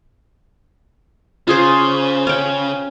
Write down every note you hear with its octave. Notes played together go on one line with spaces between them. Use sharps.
C#3 F4 G#4 C5
C#4 G5